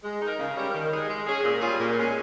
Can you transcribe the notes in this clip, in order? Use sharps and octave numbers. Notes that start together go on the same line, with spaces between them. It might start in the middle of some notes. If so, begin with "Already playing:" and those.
G#3
D#4 A#4
C#3
G3 C#4 G4 A#4
D#3
G#3 D#4 G#4
G#3
C#4 G#4
A#2
G3 C#4 F4 G#4
A#2
G#3 C#4 G#4